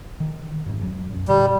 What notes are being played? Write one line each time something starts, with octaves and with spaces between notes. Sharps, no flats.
D#3
F2 G#2
F2 F#3
B1 F#2
F2 A#2 D3 G3